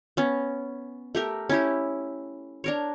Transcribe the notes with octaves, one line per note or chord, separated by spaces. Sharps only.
B3 C#4
A3 G4 A#4
C#4 E4 G4
D4 A#4 C#5